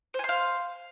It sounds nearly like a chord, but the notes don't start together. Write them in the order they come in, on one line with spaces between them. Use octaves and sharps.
C5 G#5 C6 F5